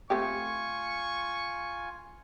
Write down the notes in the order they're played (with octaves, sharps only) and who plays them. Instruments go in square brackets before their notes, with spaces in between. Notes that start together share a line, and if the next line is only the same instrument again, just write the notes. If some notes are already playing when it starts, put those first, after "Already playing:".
[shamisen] A3 C4 G4 [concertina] F4 G#5 [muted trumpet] C#6